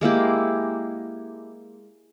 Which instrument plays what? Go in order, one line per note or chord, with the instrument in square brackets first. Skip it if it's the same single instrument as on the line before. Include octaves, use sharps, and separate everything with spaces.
[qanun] G#3 A#3 E4 G4